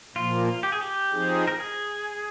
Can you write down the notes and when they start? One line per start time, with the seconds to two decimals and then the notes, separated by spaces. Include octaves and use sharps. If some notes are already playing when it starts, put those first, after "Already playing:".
0.15 A#2 F3 A#3 F4
0.63 G4
0.72 G#4
0.81 G4
1.11 F3 C4 D#4 G#4
1.48 A#4
1.60 G#4